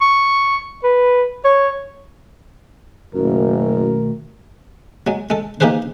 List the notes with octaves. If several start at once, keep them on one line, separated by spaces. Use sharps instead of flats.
C#6
B4
C#5
F#1 F#2 B2 D#3 A3 A#4
F#3 G#3
G#3 A4
A#3 D#4 G4 G#4 B4 C5